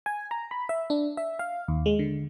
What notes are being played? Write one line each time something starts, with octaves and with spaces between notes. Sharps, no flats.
G#5
A#5
B5
E5
D4
E5
F5
D#2
G#3
D3